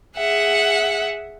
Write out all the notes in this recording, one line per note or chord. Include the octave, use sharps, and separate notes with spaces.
G#4 E5 F#5